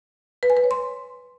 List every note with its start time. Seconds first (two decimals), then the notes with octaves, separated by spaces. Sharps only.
0.43 B4
0.50 G#5
0.57 B4
0.64 C#5
0.71 C6